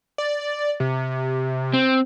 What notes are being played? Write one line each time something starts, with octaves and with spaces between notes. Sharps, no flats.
D5
C3
C4